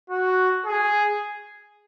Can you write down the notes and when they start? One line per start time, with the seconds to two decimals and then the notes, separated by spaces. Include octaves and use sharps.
0.10 F#4
0.66 G#4